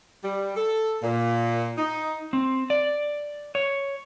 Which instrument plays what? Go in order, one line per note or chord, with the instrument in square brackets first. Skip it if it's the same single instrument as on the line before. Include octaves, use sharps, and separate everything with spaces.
[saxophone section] G3
A4
A#2
D#4
[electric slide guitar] C4
D5
C#5